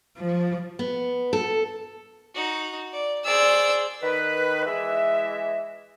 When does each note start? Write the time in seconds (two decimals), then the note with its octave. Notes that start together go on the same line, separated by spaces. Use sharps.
0.18 F3
0.79 B3
1.33 A4
2.34 D#4 F#4
2.92 D5
3.25 G#4 C5 D5 E6
4.02 D#3 B4
4.66 E3 G#3 E5